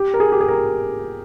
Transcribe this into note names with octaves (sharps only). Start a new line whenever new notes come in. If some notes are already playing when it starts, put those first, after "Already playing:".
Already playing: G4
A#4
G#4
G4
G#4
A#4